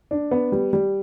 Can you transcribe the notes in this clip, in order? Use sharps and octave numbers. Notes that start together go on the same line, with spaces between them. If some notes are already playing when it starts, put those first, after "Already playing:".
D4
B3
G3
G3